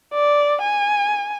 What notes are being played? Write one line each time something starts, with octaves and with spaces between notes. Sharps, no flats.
D5
G#5